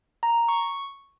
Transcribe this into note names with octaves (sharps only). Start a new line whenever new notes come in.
A#5
C#6